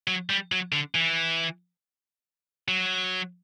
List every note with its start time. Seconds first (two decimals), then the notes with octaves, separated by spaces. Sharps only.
0.08 F#3
0.30 G3
0.52 F#3
0.72 D3
0.95 E3
2.68 F#3